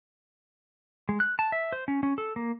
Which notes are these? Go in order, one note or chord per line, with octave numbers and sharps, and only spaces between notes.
G#3
F#6
A5
E5
C5
C#4
C#4
A4
A#3